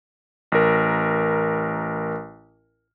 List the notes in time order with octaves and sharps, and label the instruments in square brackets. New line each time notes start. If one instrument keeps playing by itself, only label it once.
[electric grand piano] A1 A#4